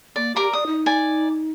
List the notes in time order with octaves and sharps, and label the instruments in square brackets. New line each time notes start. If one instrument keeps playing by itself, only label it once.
[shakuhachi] A#3 [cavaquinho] D5
[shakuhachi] G4 [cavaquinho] A#4 D5 A#5
[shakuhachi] D5 [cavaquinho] D#6
[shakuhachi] D#4
[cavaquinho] D5 G#5